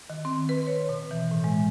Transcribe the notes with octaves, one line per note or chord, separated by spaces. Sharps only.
D#3
C4
B4
C#5
B2
E3
A2
G#3